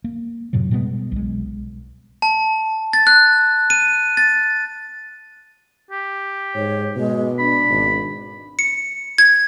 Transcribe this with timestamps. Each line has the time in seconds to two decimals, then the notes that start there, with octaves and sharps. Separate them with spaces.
0.04 A#3
0.53 F#2 A2 C3 F#3
0.71 B2 G3 G#3 B3
1.12 B1 G#3
2.22 A5
2.93 A6
3.07 F#6
3.70 D#7
4.17 A6
5.91 G4
6.55 G#2 C#5
6.96 B2 G#3
7.39 D4 B5
7.70 G#1
8.59 C#7
9.18 G#6